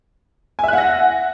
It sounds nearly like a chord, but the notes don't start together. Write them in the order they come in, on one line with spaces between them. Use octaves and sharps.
G#5 E5 F#6 F#5 A#6